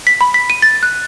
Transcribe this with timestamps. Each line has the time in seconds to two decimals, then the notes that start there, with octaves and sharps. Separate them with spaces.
0.07 B6
0.21 B5
0.34 B6
0.50 D#7
0.62 A6
0.83 F#6